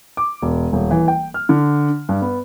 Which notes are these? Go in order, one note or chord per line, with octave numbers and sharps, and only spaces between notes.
D6
E1
D#1
E3
G5
F6
D3
G2
B3